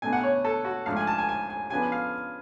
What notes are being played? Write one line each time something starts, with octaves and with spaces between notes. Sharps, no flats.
B2 A3 D4 G#5
F#5
C#5
A4
F#4
G#2 F3 A3 D4 F5
G#5
A5
G#5
G#5
G#5
C#3 F3 B3 D4 G#5
F5